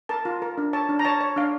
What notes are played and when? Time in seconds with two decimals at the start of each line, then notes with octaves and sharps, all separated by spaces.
0.09 A#4 A5
0.25 F4
0.42 A#4
0.58 D4
0.73 C#5 A5
0.89 D4
0.99 A#5
1.05 C#5 A5
1.21 C#5
1.36 D4 F5